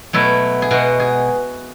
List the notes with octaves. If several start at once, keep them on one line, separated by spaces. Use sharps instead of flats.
B2 F#3 A3 E4
G#4
B2 G#3 F#4
G#4